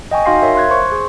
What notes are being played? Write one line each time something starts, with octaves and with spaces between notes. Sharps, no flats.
D#5 G5 G#5 C#6
D#4 F#4 F5 C6 A#6 C7
A#4 C#5 E5 F5
C6 F#6 G#6
C5 C6 C#6
G#4